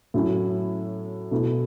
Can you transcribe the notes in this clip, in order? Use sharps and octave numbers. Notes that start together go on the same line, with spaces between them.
A2 F#3 C#4 E4
B2 A3 E4